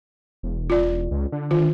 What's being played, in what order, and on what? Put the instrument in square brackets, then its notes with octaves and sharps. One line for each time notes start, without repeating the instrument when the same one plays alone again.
[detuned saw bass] E1
[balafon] F4 D5
[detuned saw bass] C#2
D3
[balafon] D#3 F4